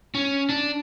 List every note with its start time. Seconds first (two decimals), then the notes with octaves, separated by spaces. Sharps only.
0.14 C#4
0.49 D4